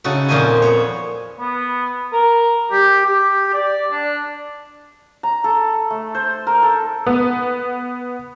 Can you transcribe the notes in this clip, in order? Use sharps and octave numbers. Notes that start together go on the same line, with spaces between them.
C#3 D#4 E4 F#4 A4
F2 A#2 A#3 C5 D#5 G#5
B3 C#5
B3
A#4
G4
G4
D5
D4
A#5
A4
A3
C5
A#4
A4
B3